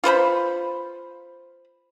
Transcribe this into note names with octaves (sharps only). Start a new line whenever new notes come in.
F4 B4 C5 B5